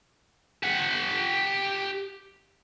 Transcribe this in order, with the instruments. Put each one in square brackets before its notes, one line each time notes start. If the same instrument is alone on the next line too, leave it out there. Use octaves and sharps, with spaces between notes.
[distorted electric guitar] G4 F#5